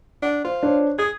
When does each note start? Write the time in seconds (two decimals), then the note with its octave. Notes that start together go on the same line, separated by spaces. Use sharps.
0.22 D4 F#5
0.44 F4 C5
0.63 D4 C5 C#5
0.99 G#4 G#6